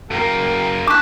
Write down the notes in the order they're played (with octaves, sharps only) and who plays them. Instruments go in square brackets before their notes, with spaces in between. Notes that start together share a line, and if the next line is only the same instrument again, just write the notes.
[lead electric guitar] F#2 A#3 [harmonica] A#4 G5
[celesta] D4 C#6 F#6 [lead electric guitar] A5 [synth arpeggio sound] D6 B6